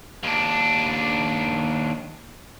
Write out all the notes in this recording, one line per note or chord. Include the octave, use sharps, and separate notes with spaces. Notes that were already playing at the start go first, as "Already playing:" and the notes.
D#2 D4